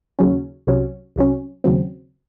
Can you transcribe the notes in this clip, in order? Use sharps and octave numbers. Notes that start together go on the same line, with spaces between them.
D#2 C#3 F#3 C#4
C2 C3 F#3 C#4
C2 C3 F#3 C#4
D#2 C#3 F#3 C4